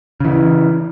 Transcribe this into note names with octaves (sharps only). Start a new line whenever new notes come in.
C#3 E3